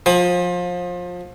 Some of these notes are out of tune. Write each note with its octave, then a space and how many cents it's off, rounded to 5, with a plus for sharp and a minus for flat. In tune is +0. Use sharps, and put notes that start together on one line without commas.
F3 +30 G5 +45